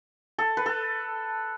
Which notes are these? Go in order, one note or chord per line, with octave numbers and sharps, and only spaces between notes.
A4
B4
A4